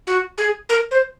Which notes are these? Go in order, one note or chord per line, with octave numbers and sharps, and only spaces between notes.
F#4
G#4
A#4
C5